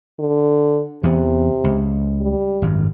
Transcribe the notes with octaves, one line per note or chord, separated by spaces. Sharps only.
D3
E2 C3 E3 B3
C#2
G3
G#1 F#2